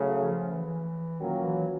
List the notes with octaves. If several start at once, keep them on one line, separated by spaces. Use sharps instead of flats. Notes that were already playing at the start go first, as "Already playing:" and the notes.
Already playing: C#3 F#3 A3
F3
E3
A#2 D#3 F#3 A#3 C#4
E3